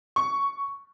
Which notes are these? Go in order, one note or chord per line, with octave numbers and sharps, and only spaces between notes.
C#6